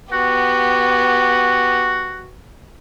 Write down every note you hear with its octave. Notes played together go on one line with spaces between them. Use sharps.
B3 F#4 G4